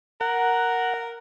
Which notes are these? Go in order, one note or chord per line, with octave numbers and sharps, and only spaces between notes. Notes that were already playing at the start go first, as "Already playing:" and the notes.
A#4 F#5